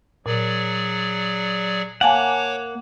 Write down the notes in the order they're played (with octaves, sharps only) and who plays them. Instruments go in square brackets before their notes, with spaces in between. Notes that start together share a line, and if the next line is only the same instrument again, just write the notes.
[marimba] A#2 [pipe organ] F#3 G#4 D5
[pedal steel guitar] A#3 F#5 [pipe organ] C#5 D6 [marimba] F5 G#5 A5